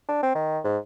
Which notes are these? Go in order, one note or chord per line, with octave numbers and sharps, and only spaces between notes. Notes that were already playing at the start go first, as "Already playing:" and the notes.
D4
C4
D#3
G#2